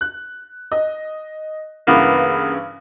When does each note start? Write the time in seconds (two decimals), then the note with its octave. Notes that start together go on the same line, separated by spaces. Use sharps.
0.01 F#6
0.72 D#5
1.87 G2 C#3 E3 A#3 B3